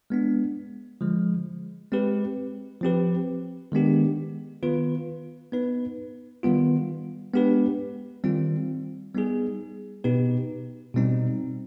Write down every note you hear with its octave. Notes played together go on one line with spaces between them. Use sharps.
G#3 B3 D4
D3 F3 G#3
G#3 C4 G4 B4
F3 C4 G4 B4
D#3 G#3 B3 D4 G4
D#3 B3 F4 B4
B3 D#4 B4
D#3 G3 B3 F4
G#3 B3 D4 G4 B4
D#3 G3 C4 F4
G3 B3 D#4 G#4
B2 B3 D#4 G4 B4
B2 G3 C4 D#4